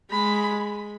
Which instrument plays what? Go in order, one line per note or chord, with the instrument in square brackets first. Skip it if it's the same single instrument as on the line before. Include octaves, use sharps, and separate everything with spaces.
[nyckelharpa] G#3 [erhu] B5